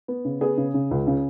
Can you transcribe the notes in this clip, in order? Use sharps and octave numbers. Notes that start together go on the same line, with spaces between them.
B3
C#3
B3 G#4
C#3
C#3
C#2
C#3